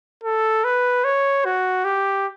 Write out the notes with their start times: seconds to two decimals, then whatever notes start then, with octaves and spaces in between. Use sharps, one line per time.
0.23 A4
0.64 B4
1.05 C#5
1.45 F#4
1.85 G4